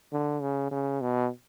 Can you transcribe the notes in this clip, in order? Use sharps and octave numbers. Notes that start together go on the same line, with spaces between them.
D3
C#3
C#3
B2